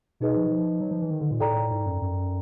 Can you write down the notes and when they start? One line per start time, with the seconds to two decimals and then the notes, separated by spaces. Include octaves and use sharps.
0.20 B2 D#4 G#4 B4 D#5
0.36 F3
0.51 F3
0.80 F#3
0.91 F3
1.01 E3
1.10 D#3
1.21 D3
1.31 A#2
1.40 A2 A4 D5 G5 A#5
1.71 G#2
1.86 F#2
2.01 F#2